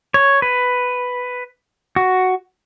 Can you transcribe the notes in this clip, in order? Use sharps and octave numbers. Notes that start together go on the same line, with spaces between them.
C#5
B4
F#4